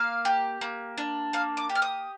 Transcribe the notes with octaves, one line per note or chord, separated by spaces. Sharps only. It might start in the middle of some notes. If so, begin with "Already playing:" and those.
Already playing: A#3 F5
G4
A#3
D4
A#3 F5
D6
G4
F6
D#6